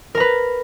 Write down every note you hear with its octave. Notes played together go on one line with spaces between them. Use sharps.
A#4 B4 A#5